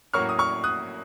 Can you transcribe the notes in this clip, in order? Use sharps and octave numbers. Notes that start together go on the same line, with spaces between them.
A2 F#3 A#3 C#4 C#6 F6
D#6
C#6 F6
D#6 F#6